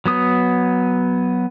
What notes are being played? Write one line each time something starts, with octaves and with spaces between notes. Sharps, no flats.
F#3 B3 D#6